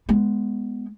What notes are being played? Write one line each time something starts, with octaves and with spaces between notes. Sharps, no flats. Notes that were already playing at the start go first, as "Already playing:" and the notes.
G#3 B3